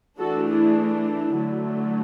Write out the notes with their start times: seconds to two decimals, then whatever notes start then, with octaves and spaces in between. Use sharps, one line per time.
0.19 E3 A3 D4 F#4 A4
0.49 E4 G#4
0.78 E4
1.37 D3 F#3 A3